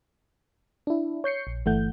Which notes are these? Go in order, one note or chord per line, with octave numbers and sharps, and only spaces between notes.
D4 E4
C#5 G6 C7 C#7
A#1
G1 E3 A3 F#5 G6